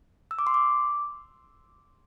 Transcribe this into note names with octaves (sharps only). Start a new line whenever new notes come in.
E6
D6
C6
D6